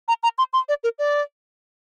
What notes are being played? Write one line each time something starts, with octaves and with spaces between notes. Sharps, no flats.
A#5
A#5
C6
C6
D5
A#4
D5